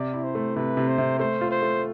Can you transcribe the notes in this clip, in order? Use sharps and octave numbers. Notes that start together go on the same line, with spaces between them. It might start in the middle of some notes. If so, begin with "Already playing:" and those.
Already playing: C3 D5
E4
C5
A3
C3 B4
C3
C5
C3
A3 C5
F4
C5
A3